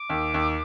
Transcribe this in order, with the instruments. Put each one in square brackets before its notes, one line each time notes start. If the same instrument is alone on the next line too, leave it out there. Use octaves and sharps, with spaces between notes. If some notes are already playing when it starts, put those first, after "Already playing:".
Already playing: [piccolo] D6
[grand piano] D#2
D#2